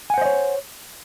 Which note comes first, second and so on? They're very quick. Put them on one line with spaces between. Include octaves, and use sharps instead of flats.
G#5 F#5 C5 D#5 C#5